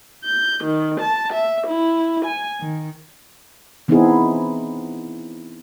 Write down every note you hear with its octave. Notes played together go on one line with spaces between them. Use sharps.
G6
D#3
A5
E5
E4
G#5
D#3
E3 B3 C4 D#4 E4 G#4